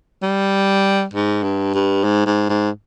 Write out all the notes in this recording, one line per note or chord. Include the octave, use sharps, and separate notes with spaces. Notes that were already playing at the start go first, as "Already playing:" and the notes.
G3
G#2
G2
G2
G#2
G#2
G#2